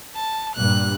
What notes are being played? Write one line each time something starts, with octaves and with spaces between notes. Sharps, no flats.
A5
G2 A#2 G3 F#6